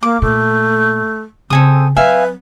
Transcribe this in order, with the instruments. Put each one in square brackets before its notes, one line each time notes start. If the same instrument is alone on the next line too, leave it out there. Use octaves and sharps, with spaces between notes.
[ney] A#3 [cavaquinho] D6
[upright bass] A#2 [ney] A3
[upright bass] C#3 [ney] C4 [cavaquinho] A4 G#5 D#6
[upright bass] F#3 C4 [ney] B4 [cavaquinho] E5 F5 G#5